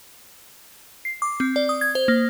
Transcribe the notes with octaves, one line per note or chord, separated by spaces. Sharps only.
C7
D6
C4
D5
D#6
G#6
C5
A#3